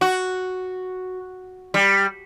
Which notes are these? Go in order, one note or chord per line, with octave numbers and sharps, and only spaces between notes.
F#4
G3